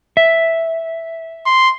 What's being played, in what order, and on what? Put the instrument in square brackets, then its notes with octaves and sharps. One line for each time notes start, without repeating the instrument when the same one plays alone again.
[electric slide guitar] E5
[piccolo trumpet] C6